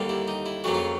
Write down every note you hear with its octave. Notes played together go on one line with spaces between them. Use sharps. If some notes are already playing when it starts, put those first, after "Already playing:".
Already playing: D#2 D3 G3 A#3
E4
D#4
E4
F2 C#3 F#3 A#3 F#4
F4